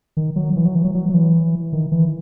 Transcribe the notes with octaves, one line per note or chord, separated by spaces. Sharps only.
D#3
F#3
E3
F#3
E3
F#3
F#3
F#3
E3
D#3
E3